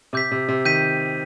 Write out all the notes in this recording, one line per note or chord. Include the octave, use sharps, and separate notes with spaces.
C3 D6 G6 B6
C3
C3
D#3 G6 B6 D#7